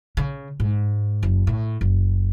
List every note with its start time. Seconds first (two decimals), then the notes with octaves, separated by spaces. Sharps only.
0.17 C#3
0.60 G#2
1.23 F#1
1.47 A2
1.81 F#1